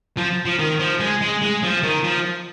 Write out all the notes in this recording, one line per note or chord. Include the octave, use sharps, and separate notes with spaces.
F3
F3
D#3
F3
G#3
G#3
G#3
F3
D#3
F3